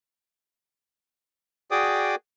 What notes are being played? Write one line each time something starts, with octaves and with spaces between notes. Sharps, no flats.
F#4 G#4 D5 G5 D6 D#6